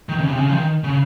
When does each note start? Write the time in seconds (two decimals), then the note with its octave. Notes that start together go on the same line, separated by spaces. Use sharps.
0.09 D#3
0.18 C#3
0.27 C3
0.36 C#3
0.49 F3
0.53 D#3
0.84 C#3